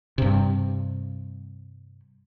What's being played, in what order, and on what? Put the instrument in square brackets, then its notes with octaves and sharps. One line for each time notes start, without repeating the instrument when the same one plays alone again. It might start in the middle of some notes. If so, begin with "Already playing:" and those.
[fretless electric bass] G2 C3